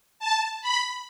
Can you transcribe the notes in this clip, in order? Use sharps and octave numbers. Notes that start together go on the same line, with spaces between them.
A5
B5